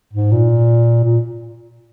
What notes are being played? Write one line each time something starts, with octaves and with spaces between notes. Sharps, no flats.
G#2
A#2
A#2